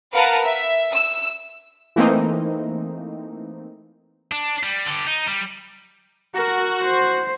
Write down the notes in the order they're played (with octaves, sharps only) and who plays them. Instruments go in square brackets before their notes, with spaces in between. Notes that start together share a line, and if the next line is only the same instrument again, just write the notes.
[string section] A#4 B4 F5 F#5 A5 A#5
E5
E6
[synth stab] E3 A3 A#3 C4 D#4
[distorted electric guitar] D4
G3
D3 G4
D#4
G3
[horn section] F#4 [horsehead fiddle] A#4
[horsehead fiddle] C5